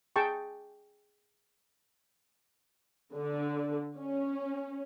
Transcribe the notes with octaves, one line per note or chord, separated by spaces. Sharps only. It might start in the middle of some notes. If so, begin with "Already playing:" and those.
G#4 G5 A5 C#6
D3
C#4